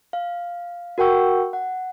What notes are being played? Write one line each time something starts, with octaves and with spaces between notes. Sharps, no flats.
F5
F#4 A#4 F#5 G5 C#6 E6
F#5